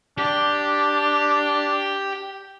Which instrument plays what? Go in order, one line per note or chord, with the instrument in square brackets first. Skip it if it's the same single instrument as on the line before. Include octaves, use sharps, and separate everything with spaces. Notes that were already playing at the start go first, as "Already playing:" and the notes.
[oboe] D4 [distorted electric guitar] G4